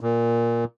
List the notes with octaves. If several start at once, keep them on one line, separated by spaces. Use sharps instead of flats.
A#2